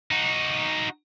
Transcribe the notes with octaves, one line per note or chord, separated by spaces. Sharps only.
D#4 F#4